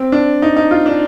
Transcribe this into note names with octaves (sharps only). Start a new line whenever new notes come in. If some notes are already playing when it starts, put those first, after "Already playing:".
Already playing: C4
D4
D#4
D#4
F4
D4